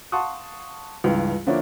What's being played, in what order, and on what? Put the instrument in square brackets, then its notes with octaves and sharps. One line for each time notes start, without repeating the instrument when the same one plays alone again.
[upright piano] F5 F#5 A5 C6 C#6 D#6
C#2 G2 E3
D3 F3 A#3 D4 E4 C#5